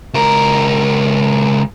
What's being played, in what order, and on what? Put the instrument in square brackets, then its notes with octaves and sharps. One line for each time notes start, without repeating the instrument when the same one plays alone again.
[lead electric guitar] C#2 A#4